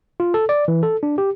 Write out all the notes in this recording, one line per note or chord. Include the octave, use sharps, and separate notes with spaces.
F4
A4
D5
E3
A4
D4
G4